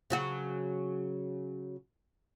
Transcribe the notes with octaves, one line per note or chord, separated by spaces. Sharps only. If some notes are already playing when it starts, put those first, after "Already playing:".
C#3 F#3 F#4